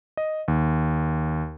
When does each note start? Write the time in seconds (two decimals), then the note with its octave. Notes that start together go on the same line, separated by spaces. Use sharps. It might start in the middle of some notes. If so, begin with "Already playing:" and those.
0.17 D#5
0.48 D#2